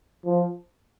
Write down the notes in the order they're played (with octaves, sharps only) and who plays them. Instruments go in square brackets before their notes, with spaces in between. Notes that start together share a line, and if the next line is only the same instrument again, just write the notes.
[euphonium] F3